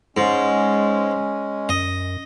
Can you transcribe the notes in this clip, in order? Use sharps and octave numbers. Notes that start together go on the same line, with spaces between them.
G#2 G#3 C#4
F#2 D#5